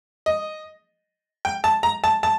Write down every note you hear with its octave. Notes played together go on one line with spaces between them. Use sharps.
D#5
G5
A5
A#5
A5
A5